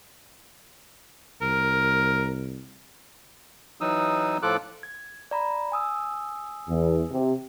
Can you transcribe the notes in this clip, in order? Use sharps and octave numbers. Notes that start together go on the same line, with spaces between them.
C2 A#4
E3 F#3 D#4 D#6 E6
A2 F3 F4 A4 D6 F#6
G#6
D5 A#5 B5
G#5 D#6 E6
E2
C3